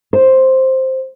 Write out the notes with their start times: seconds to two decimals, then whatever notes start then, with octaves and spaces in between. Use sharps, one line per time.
0.13 C5